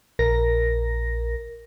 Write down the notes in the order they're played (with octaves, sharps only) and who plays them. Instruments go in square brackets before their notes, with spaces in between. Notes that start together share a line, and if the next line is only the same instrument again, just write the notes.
[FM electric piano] A#1 A#4 A#6